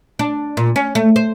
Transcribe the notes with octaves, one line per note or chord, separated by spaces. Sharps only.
D4
A#2
C#4
A3
C5